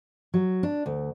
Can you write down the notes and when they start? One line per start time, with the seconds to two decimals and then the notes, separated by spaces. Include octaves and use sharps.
0.34 F#3
0.63 D4
0.86 D2